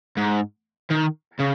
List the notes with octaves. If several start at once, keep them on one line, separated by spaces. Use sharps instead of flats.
G#2
D#3
C#3